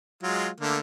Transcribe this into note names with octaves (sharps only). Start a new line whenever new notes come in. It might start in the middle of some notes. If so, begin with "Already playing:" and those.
F#3 G#3 F4
D3 A3 A#3